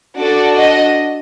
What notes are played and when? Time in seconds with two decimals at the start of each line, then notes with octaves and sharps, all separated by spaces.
0.18 D4 F#4 A4 D5
0.55 D#5